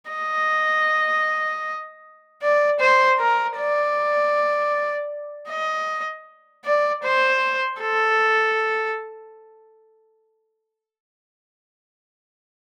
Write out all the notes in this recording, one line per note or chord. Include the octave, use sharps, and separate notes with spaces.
D#5
D5
C5
A#4
D5
D#5
D5
C5
A4